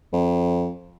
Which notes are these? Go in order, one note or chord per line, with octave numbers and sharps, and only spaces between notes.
F2